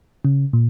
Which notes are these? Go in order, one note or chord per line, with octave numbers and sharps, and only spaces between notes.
C#3
A#2